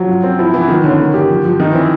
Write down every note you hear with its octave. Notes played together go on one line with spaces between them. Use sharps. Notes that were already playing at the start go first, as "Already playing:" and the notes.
Already playing: F3 F#3
F4
C4
F3 E4
E3 B3
D#3 F3
D3 C#4
A#3
G4
F3
F3
D#3 D#4
E3 C4